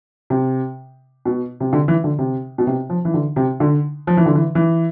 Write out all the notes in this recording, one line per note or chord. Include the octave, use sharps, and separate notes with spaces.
C3
B2
C3
D3
E3
D3
C3
B2
C3
F3
E3
D3
C3
D3
F3
E3
D3
E3
E3